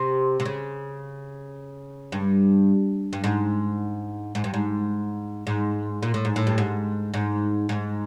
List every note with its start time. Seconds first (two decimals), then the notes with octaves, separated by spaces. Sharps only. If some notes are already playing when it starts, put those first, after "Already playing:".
Already playing: C3
0.40 C3
0.45 C#3
2.12 G2
3.13 G2
3.24 G#2
4.35 G#2
4.44 G2
4.54 G#2
5.47 G#2
6.03 A#2
6.14 A2
6.25 G#2
6.36 A2
6.47 G2
6.58 G#2
7.14 G#2
7.69 G#2